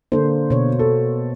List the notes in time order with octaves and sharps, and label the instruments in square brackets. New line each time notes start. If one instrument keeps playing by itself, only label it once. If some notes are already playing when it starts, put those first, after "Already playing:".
[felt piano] D3 [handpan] A#3 C5
[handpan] B2 C#5
[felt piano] A4